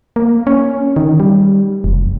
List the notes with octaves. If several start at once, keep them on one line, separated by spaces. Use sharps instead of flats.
A#3
C#4
D#3
G3
F1